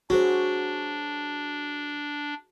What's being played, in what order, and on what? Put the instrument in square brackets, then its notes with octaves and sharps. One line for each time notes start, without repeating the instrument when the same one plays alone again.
[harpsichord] F#3 [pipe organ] D4 [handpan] F#4 G#4 C5